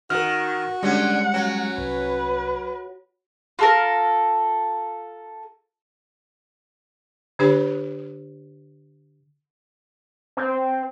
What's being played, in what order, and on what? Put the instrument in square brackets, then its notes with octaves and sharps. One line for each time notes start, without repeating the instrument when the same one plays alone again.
[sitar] D#3 [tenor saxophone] F#4 [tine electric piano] A#4 F6
[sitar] D3 C#4 [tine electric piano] G3 G#3 [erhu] F#5
[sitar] F#3 [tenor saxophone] C#4
[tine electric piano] C2 [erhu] B4
[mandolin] F4 A4 A#4
[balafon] D3 D4 G4 C#5 B5
[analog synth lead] C4